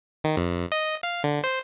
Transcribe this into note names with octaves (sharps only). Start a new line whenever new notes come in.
D#3
F2
D#5
F5
D3
C5